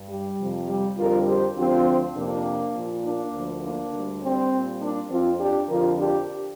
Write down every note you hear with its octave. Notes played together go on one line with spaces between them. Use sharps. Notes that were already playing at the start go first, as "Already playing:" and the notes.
Already playing: G2
G3
F2 C3 F3
G3
F2 D3 G3 F4 A#4
G4 C5
D2 D3 F3 C4 F4
F2 C3 F3 A#3 D4
A#2 F3
A#3 D4
D2 D3 F3
A#3 D4
D2 D3 G3
G3 C4
A#2 G3
A#3 D4
F2 F3 C4 F4
D4 G4
F2 D3 F3 F4 A#4
D4 G4